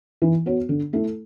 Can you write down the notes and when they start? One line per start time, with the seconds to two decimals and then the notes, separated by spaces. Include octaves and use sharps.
0.22 E3
0.46 B3 F#4 C#5
0.69 D3
0.93 A3 E4 A4